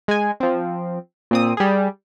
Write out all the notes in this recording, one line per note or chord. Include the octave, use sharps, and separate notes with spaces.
G#3 G#5
F3 C4
A#2 C4 D#6
G3 G#4